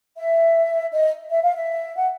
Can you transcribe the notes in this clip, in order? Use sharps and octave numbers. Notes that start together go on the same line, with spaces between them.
E5
D#5
E5
F5
E5
F#5